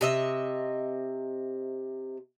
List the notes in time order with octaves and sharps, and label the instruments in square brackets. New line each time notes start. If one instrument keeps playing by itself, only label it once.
[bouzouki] C3 D#5 E5